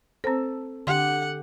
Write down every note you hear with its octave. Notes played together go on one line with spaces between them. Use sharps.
C4 A4 C5
D3 G4 F#5 C6